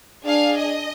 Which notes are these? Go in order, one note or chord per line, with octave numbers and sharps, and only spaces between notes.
D4 G#4 F5
D#5